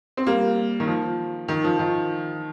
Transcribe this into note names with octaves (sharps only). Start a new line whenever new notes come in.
C4
G3 A#3
D#3
F3
D#3
F3
D#3